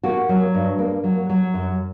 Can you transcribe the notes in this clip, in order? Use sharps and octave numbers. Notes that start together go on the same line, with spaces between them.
A#3 F#4
F#3
G2
A#3
F#3
F#3
F#2